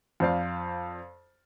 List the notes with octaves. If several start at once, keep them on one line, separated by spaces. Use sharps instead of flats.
F2 F4 C5 D5 F5